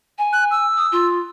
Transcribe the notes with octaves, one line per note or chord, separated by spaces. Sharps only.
G#5
F#6
E6
D#6
F4